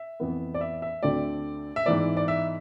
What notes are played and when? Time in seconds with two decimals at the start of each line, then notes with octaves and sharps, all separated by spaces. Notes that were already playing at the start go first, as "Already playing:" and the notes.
Already playing: E5
0.20 F2 E3 B3
0.54 D5
0.61 E5
0.82 E5
1.03 D2 D3 A3 C4 D5
1.76 E5
1.86 G#2 E3 B3 D5
2.17 D5
2.28 E5